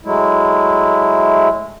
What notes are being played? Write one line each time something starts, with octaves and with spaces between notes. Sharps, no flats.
F#3 G#3 A3 E4